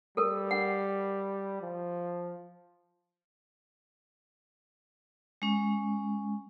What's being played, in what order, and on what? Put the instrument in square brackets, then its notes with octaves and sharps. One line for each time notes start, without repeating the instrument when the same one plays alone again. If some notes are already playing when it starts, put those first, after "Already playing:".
[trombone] G3 [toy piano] A4 A#4
[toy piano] F#5
[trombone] F3
[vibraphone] G#3 C#4